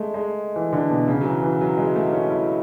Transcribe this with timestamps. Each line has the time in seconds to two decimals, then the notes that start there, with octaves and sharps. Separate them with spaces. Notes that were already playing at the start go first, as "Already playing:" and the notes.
Already playing: G#3 A3
0.14 G#3
0.56 E3
0.73 D3
0.90 B2
1.08 C#3
1.21 F#3
1.25 E3
1.42 E3
1.61 F#3
1.78 G#3
1.96 A3
2.13 C#4
2.30 E4